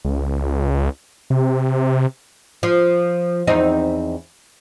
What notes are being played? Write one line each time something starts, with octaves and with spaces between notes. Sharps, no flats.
C#2
C3
F3
E2 C4 D#4